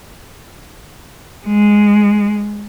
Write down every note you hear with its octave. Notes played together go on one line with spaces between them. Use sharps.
G#3